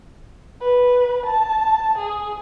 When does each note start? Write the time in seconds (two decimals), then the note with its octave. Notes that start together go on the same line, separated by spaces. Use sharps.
0.60 B4
1.25 A5
1.97 G#4